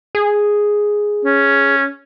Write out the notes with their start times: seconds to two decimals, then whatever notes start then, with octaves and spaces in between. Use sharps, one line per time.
0.15 G#4
1.25 C#4